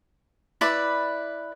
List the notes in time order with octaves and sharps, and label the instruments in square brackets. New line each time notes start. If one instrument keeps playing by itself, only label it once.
[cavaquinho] E4 B4 D5 B5